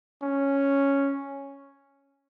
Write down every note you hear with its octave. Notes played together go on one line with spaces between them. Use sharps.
C#4